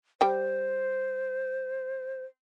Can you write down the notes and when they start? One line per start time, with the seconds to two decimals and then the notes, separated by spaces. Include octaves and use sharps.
0.21 G3 C5 G5